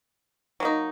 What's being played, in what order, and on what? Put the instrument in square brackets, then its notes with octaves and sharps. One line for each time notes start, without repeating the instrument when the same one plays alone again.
[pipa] F#3 A#3 D#4